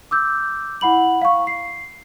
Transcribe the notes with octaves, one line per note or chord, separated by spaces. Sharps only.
D6 E6 G6
E4 F#5 B5 F#7
F5 C#6
C7